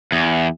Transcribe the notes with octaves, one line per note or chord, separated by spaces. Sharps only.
E2